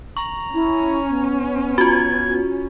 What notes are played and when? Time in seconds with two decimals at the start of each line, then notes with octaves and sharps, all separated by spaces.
0.17 A#5 C#6
0.54 C#4 E4
1.09 B3
1.78 F4 F#4 G#6